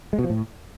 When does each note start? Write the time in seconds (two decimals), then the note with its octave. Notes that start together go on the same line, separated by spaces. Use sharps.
0.13 G#3
0.19 B2
0.24 F3
0.30 A2